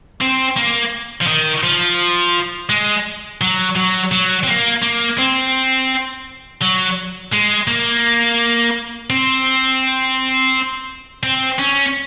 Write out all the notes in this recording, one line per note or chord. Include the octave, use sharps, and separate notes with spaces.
C4
A#3
F3
D#3
F3
G#3
F#3
F#3
F#3
C4
A#3
A#3
C4
F#3
G#3
A#3
C4
C4
C#4